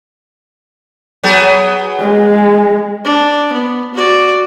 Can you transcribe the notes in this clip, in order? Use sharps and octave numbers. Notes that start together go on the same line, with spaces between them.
F#3 B3 G#4
G#3
D4
B3
F#4 D5